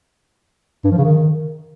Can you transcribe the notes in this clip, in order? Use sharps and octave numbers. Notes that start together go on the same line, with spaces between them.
G2
F3
C#3
D#3